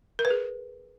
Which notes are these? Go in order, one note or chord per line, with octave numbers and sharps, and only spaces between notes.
A#4
B4
G#4